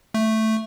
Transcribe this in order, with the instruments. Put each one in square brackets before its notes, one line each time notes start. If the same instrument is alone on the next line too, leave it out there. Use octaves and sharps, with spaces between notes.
[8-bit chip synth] A3